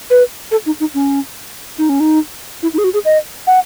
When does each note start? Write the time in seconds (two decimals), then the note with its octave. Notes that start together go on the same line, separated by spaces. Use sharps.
0.10 B4
0.51 A4
0.66 D#4
0.80 D#4
0.94 C#4
1.78 D#4
1.89 C#4
2.00 D#4
2.63 E4
2.74 D#4
2.78 G#4
2.84 F#4
2.94 G#4
3.05 D#5
3.47 F#5